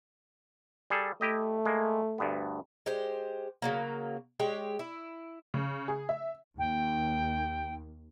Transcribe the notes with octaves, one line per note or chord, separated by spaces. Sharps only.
G3 G#4 A4
A3 E4 G4 D#5
G#3 A#3
D2 G2 B3
G#3 G4 C5
C#3 F#3 A#3
G#3 G4 C#5
E4
C#3
G#4
E5
D#2 G5